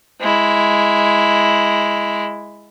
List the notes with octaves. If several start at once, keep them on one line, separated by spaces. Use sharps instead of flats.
G#3 E4